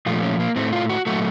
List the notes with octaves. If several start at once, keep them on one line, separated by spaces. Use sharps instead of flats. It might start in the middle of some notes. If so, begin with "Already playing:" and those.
A#2 F3 A3 F4
C#4
A#3
A2 A3 C4
F4
F#4
A#2 F#3 A3 F#4